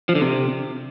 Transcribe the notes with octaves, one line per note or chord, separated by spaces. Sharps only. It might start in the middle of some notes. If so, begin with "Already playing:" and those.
F3
D3
C3